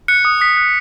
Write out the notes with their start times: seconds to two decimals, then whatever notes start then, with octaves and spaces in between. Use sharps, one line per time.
0.08 F#6 C#7
0.25 D#6
0.41 D#6 B6
0.57 F#6